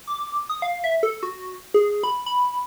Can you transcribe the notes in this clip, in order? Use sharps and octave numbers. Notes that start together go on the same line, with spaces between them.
D6
D#6
F5
E5
A4
F#4
G#4
B5
B5